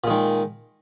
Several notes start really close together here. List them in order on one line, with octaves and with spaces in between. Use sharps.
A#2 G#3 D#3